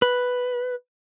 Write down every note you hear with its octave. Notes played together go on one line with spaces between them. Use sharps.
B4